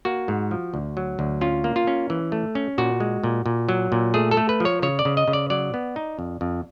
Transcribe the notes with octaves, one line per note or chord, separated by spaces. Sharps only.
A#3 F#4
G#2
F3
D2
F#3
D2
C#4 F4
A#3
F4
C#4
E3
A3
C#4
A#2 F#4
G#3
A#2
A#2
F#3
A#2
A3 G#4
A4
A3
B4
F3 C#5
C#3 C#5
D5
C#3
D#5
C#3
D5
F#3 D5
B3
D#4
F2
F2